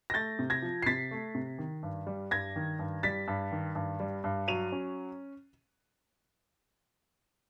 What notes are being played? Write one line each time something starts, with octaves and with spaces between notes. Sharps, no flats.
A#6
A3 G6 A6
C3
G#6 A#6
F3
C7
C3 A6 B6
A3
C3
D#3
G2
G3
G2 G#6 A#6
D#3
G2
G3 A6 B6
G2
D#3
G2
G3
G2
F#3 D#7 F7
C#4